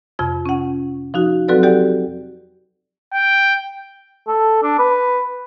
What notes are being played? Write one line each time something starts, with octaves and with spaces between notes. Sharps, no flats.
F2 C3 F4 G#6
C#4 F#5
F3 D#4 F#4
F#3 C4 F#4 A4 B4 D5
G4 A4 D5 F#5 G5
G5
A4
D4
B4